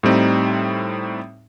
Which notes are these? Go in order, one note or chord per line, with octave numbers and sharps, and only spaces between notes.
A2 G3 C4 D#4